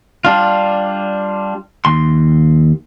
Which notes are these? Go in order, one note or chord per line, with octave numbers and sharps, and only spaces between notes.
G3 D4 F4
D#2 C6